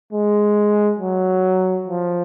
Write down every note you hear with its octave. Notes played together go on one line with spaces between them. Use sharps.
G#3
F#3
F3